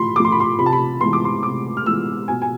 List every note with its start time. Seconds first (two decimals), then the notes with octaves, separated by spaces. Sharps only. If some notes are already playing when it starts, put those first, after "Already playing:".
Already playing: A2 F3 B5 C6
0.16 A3 D6
0.20 F3 C6
0.32 B5
0.40 C6
0.58 C3 B5
0.66 A5
0.73 B5
1.01 E3 G#3 B3 C6
1.13 D6
1.25 C6
1.43 C3 D6
1.77 F6
1.86 E3 G#3 B3 E6
2.28 B2 G#5
2.42 G#5